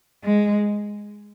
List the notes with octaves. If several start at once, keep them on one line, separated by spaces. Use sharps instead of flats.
G#3